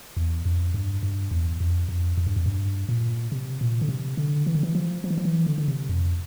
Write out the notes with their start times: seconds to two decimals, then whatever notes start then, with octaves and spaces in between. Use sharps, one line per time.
0.17 E2
0.45 F2
0.74 G2
1.03 G2
1.31 E2
1.60 F2
1.89 F2
2.17 F2
2.27 G2
2.36 F2
2.46 G2
2.89 A#2
3.32 C3
3.61 A#2
3.81 D3
3.89 C3
4.17 D3
4.46 E3
4.55 D3
4.63 E3
4.75 F3
5.04 F3
5.10 E3
5.18 F3
5.25 E3
5.47 D3
5.58 D3
5.68 C3
5.89 F2